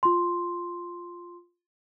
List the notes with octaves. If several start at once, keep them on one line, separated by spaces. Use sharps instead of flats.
F4 C6